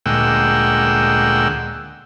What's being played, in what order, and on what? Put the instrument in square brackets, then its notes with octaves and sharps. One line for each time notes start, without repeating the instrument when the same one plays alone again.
[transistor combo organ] D2 A#2 G#3 F#5 G5 E6